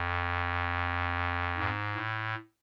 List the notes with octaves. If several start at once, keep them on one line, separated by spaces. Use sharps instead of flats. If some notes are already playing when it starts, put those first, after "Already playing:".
Already playing: F2
G#2
A2